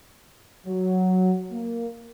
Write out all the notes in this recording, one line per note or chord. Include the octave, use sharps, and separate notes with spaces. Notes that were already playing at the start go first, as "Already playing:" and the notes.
F#3
A#3